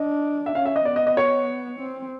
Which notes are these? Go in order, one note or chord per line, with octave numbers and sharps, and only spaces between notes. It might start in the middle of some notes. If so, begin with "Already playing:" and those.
Already playing: D4 D#5
E5
C#4 F5
E5
D#5
B3 D5
D#5
D#5
C#5
C4